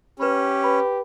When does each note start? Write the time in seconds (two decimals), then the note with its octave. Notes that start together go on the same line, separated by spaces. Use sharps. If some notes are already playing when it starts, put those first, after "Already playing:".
0.20 C#4 G4 B4 B5
0.64 B4 B5